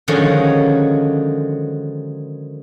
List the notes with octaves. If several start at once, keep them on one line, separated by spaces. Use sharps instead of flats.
D3 D#3 F3 F#3 G#3 C#4